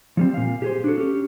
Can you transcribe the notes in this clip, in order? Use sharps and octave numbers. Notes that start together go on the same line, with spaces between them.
F3 G3 C4
A#2 F5
G4 G#4 C5
D4 F#4 A4
C#4 G4